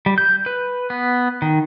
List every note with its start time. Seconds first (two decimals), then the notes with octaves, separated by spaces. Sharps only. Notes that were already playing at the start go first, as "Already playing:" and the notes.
0.06 G3
0.18 G6
0.46 B4
0.90 B3
1.42 D#3